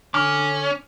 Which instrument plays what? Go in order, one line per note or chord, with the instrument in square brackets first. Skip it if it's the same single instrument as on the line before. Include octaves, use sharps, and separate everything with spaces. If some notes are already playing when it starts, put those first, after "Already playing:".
[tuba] D3 [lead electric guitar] C#4 [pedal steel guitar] D6 F6